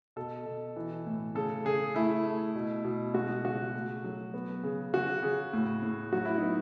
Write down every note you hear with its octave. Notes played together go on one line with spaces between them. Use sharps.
B2 A4
B2
E3
A2
C#3 A4
C#3 G#4
A3 E4
A3
B2
B2
G#3 F#4
C#3 F#4
A3
F#3
B3
C#3
C#3 F#4
C#3
A2
A2
F#3 F#4
E4
B3 D#4